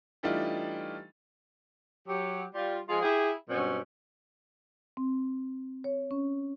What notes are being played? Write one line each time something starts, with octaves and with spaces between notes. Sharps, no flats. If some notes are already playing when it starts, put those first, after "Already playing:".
E3 G3 A3 D4 D#4 F4
F#3 G4
G3 F4
F3 G#3 F4 G#4
E4 G4 G#4
G2 B2 F#3 C4 C#4
C4
C#5
C#4